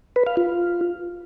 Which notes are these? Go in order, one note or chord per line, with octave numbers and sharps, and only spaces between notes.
B4
F5
F4